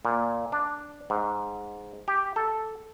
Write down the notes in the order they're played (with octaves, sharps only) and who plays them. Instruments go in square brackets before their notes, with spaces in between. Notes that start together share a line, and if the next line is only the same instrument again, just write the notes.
[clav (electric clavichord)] A#2
D4
G#2
G4
A4